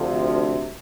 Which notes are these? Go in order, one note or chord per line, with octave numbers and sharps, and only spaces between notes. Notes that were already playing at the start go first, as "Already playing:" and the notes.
Already playing: D2 C3 F3